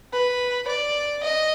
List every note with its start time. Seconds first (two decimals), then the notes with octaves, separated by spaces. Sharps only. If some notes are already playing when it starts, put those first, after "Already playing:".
0.13 B4
0.68 D5
1.23 D#5